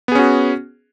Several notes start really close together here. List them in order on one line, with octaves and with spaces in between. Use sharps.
B3 G#4 C#4 F#4